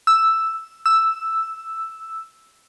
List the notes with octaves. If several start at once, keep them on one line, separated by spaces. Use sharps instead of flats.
E6
E6